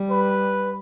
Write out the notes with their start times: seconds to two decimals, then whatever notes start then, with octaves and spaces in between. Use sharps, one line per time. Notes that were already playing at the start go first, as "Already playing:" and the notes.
Already playing: G3
0.10 B4